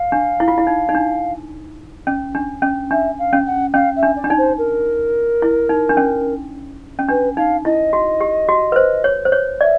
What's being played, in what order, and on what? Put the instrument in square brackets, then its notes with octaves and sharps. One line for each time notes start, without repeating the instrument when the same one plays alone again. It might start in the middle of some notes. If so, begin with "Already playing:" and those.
Already playing: [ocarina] F5
[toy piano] D4
E4
F4
E4
D#4
D#4
D4
C#4
D4
C#4
[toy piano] D4 [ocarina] E5
[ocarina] F5
[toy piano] C#4
[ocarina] F#5
[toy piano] C#4 [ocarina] F5
[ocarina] E5
[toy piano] D4
[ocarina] D5
[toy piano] D4
D#4
[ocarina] C5
A#4
[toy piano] E4
D#4
D4
C#4
C#4
[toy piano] D4 [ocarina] B4
[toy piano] D#4 [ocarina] F5
[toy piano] E4 [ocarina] D#5
[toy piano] F#4
G4
F#4
B4
C5
C#5
C5
C#5
[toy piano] D5 [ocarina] E5